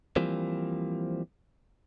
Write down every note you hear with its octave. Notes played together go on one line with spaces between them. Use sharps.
E3 F3 G3 A#3 C4